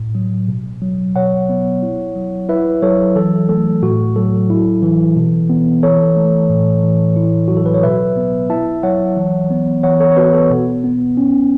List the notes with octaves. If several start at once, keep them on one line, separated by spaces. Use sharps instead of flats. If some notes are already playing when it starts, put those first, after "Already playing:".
Already playing: A2
F#3
B2
F#3
B2 C#5 F#5
B3
E4
F#3
E4 B4 E5
F#3 A4 C#5
E3 A4
A3 A4
A2 F#4
F#3 A4
E4
E3
B2
B3
E3 A4 C#5
A3
A2
E3
E4
F#3 F#4
A4
B4
C#5
B2 B4 E5
B3
E4 E5 A5
F#3 C#5 F#5
E3
B3
E3 C#5 F#5
A4 C#5
C#5
B3 F#4 B4
A4
B2
B3
C#4